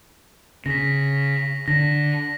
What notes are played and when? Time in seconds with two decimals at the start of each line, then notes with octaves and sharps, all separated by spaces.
0.66 C#3 A#6 B6
1.68 D3 A#6